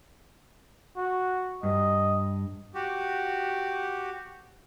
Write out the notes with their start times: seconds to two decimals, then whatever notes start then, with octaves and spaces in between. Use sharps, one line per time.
0.97 F#4
1.63 G2 D#5
2.75 F#4 G4